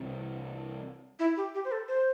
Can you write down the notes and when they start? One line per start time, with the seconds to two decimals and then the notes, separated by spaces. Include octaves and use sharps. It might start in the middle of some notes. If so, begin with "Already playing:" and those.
Already playing: C2 C3 E3 C4
1.19 E4
1.37 G4
1.55 G4
1.65 C5
1.72 A4
1.88 C5